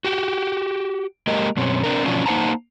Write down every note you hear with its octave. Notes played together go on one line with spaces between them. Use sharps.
F#4 G4
G#3 A#3 G4 A#4 D#5
F#2 B2 C4 C#4
C4 D4 A#4
B2 F3 F#3 C#4 D4 F4
A#3 D#4 C5 F#5 A5 A#5